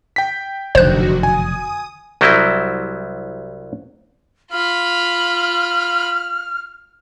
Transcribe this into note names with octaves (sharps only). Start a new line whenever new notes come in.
G5 B6
F1 F#2 B2 D3 D#3 F#4 C5 F#6
G#5 D#6
C2 F#3 G3 C4 E4 D#5
F4 B5 F6